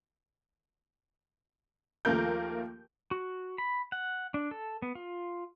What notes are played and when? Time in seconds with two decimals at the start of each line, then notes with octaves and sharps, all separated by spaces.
2.05 D#2 F3 A3 A#3 A#4 G6
3.11 F#4
3.58 B5
3.92 F#5
4.34 D4
4.51 A4
4.82 B3
4.95 F4